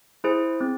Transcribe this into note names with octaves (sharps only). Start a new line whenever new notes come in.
E4 G#4 C5
C4